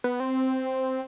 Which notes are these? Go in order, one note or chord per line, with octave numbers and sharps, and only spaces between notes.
B3
C4